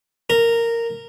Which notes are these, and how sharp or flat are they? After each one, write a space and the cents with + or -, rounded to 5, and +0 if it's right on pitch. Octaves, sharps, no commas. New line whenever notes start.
A#4 -10